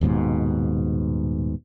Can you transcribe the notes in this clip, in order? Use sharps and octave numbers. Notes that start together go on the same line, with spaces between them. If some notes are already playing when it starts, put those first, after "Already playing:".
D#1 D#2 G#2 B2